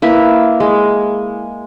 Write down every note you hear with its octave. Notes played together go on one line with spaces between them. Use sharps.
A#3 E4 B4 E5
G#3